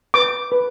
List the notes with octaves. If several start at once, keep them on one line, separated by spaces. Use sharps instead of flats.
B4 D6
B4